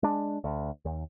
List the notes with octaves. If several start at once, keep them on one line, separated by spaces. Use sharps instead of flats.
G#3 D4
D2
D#2